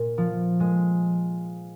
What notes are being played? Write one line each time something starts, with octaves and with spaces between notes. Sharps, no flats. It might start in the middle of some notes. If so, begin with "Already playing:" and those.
Already playing: A#2
F3
G#3